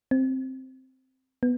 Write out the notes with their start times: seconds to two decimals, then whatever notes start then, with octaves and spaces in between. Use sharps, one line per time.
0.11 C4
1.43 B3